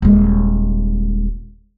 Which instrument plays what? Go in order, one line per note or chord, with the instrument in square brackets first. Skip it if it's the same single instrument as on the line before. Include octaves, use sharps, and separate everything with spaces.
[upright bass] D#1 G#3